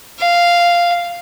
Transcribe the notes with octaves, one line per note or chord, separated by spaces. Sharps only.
F5